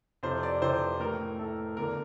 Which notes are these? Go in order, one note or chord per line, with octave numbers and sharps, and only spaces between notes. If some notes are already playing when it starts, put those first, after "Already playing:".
F2 C3 E3 C5
D5
F2 C3 E3 C5
A2 E3 A#4
A2 E3 A4
E2 D3 A#4